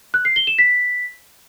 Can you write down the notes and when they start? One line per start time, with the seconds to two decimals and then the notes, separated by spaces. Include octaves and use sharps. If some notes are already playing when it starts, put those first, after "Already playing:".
0.14 F#6
0.25 C7
0.36 G7
0.47 E7
0.58 B6